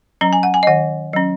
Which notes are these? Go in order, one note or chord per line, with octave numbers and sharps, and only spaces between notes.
F#3 C#4 A#5
G#5
F#5
G#5
D#5
D#3 F#5
F#3 C#4